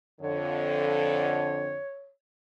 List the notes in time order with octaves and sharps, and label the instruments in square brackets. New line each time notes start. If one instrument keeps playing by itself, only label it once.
[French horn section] F2 D3 [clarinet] C#5